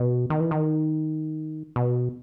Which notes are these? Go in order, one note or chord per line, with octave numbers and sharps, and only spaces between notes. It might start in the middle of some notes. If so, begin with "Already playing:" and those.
Already playing: B2
D#3
E3
D#3
B2